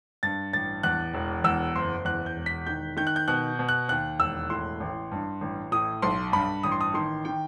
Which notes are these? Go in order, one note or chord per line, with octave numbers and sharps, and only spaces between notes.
G2 A6
A1 A6
E2 F#6
E1
E2 E6
F#1 C6
E2 F#6
G6
E1
B6
D#3 G6
D#3 G6
F#6
G6
B2 F#6
B2
F#6
D#2 F#6
E1 E6
A2 C6
A1
G2
A1
A2 D#6
B1 C6
G2 B5
A1 D#6
C6
D#6
D#3 C6
D#3 G5